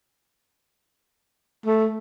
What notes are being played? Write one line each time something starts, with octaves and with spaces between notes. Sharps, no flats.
A3